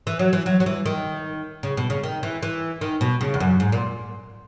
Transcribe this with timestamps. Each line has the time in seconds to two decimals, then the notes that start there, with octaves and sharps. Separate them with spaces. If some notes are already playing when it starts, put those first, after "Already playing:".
0.07 E3
0.19 F#3
0.33 E3
0.46 F#3
0.60 F#3
0.66 E3
0.86 D#3
1.63 C#3
1.77 B2
1.90 C#3
2.03 D#3
2.23 E3
2.43 E3
2.81 D#3
3.01 B2
3.21 C#3
3.34 E2
3.40 F#2
3.60 G#2
3.72 A#2